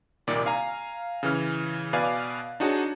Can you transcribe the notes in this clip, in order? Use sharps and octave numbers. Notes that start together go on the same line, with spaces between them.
C2 A#2 D#3 D5
F5 G#5 A#5
C#3 E3 F6
B2 B4 D5 F5 G#5
D4 D#4 F#4 G#4 C#5 A5